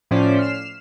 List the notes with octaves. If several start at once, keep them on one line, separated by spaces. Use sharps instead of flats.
A2 F3 C#4 C5 D5 B6
F6 C7 E7